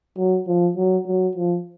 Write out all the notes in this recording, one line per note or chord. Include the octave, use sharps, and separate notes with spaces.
F#3
F3
F#3
F#3
F3